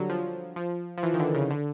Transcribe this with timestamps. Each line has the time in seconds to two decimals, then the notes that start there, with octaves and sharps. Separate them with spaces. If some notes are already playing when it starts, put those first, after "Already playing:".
Already playing: D3 F#3 G3
0.09 F3
0.56 F3
0.98 F3
1.03 E3
1.14 D#3
1.19 D3
1.34 C#3
1.50 D3